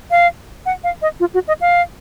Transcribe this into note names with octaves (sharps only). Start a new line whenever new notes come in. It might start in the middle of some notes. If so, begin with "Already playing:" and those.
F5
F#5
F5
D#5
F4
F#4
D#5
F5